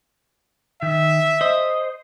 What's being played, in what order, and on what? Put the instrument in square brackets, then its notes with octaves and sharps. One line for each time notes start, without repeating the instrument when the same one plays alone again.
[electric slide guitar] D#3 [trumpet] E5
[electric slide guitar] C5 [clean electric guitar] D#5